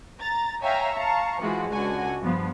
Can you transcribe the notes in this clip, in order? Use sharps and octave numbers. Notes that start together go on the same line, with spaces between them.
A#5 A6
C#5 E5 F5 G5 G#5 A#5
F5 A5 A#5 C#6
E3 F3 G#3 F4 F#4
C#2 D3 F#4 F#5 G#5
G2 F3 B3